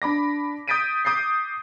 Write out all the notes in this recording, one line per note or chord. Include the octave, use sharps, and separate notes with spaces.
D4 B5 D6 A#6
D#6 G6 A6 B6 D7 D#7
D6 D#6 G6 A6 C7